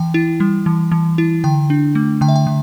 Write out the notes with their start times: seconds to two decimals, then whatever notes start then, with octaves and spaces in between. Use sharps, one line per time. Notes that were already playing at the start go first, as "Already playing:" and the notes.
Already playing: E3 G5
0.14 E4
0.40 G3
0.66 E3
0.92 E3
1.18 E4
1.44 D3 G5
1.70 D4
1.95 A3
2.21 D3 G5
2.28 E5
2.36 G5
2.47 D3